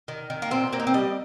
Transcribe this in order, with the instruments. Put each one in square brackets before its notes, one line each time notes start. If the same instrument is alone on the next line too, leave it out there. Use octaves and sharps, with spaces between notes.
[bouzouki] D#3
D#3
A#3
A#2 C4
A#3 C4
D#4
C4
G3 D#5